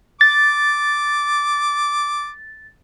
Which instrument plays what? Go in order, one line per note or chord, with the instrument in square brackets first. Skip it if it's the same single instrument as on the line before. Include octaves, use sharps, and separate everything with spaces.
[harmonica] D6 [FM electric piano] A6